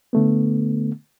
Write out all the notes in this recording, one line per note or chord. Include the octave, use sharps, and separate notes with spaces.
D3 A3 B3